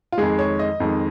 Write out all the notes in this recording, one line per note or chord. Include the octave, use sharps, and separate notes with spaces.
F4
F2 D#3 G#3 G#4
C#5
D#5
F2 D#3 G#3